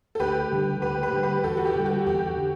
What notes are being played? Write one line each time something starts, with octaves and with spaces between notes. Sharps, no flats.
A4
D2 G4 B4
D3 G3
D2 G4 B4
G4 B4
D3 G3
G4 B4
E2 F#4 A4
F#4
G4
D3 G3
F#4
E2 G4
D3